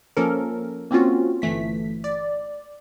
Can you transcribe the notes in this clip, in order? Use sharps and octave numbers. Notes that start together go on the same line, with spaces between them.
F3 A#3 C#4 A4 A#4
A#3 C4 C#4 F4 F#4
G1 E3 A3 B6
D5